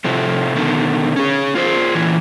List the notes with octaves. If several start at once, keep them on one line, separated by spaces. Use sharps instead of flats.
A2 C3 F3 A3
B2 D3 D#3
C#4 G#4
F4 G#4 C5
A#2 E3